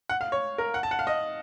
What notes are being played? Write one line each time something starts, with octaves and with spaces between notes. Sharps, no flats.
F#5
F5
C#5
A#4
F#5
A5
F#5
F5
D#5